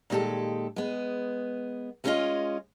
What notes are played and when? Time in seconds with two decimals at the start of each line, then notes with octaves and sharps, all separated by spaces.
0.10 A#2 D#3 G#3 F#4 G4 A4
0.76 G#3 B3
2.04 G#3 A3 C#4 E4 F4 D#5